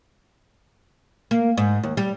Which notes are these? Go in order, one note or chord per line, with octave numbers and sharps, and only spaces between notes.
A#3
G#2
D#2
G3